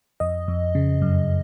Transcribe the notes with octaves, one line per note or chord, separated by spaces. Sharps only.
F2 D#5
F2
C#3
F#2